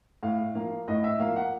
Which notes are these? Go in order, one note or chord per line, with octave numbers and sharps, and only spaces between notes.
A2 F5
F3 A#3 F5
A2 D#5
E5
F3 A#3 F5
F#5